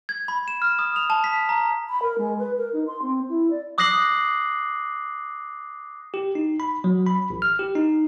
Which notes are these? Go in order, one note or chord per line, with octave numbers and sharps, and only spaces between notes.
G#6
B5
E7
F6
D#6
F7
A5
B6
A#5
B5
A#4
G#3
B4
A#4
D#4
C6
C4
E4
D5
D6 D#6 F#6 A#6 C7 F#7
G4
D#4
B5
F#3
B5
A1
F6
G4
D#4